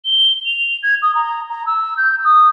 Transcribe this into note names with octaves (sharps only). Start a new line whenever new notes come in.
G7
F7
G#6
D#6
A#5
A#5
E6
G6
D#6